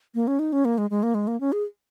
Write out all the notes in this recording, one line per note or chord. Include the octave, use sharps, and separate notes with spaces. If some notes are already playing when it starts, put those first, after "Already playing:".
A#3
C#4
D#4
C#4
A#3
G#3
G#3
A#3
G#3
A#3
C#4
G#4